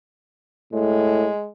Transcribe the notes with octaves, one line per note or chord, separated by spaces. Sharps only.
A2 G#3